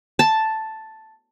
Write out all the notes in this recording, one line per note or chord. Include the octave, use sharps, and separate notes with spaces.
A5